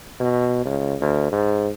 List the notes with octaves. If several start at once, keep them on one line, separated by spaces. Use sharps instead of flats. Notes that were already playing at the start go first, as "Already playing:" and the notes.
B2
C#2
D2
G#2